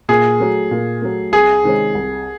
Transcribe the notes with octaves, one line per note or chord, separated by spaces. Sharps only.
A#2 G#4
F#3 A3
A#2
F#3 A3
C2 G#4
C3 D#3 G#3 C#4
C2